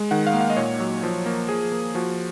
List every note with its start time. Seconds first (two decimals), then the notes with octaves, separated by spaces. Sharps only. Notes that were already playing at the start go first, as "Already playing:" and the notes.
Already playing: G#3
0.11 D#3 F#5
0.27 F5
0.34 A#3
0.41 F5
0.50 D#5
0.57 A#2 C#5
0.80 F#3
1.03 F3
1.26 A#3
1.49 F3 G#4
1.72 A#3
1.95 F3 F#4